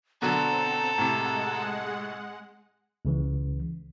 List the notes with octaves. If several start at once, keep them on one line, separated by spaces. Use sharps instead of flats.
B2 D3 F#3 C4 A4 A#5
A2 C3 G#3 F#5
C#2 C#3 E3